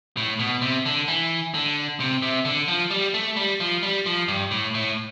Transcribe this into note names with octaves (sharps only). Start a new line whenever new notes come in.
A2
B2
C3
D3
E3
D3
C3
C3
D3
F3
G3
A3
G3
F3
G3
F3
G2
A2
A2